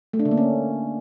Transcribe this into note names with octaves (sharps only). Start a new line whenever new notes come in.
A3
D4
D3
A#3
C#4